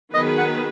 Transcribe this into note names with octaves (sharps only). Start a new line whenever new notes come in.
D#3 F#3 B3 G#4 B4 D#5
F#5